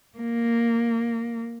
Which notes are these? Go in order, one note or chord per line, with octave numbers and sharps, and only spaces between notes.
A#3